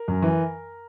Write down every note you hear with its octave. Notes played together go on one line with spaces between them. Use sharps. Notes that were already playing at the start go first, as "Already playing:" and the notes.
Already playing: A#4
F#2
E3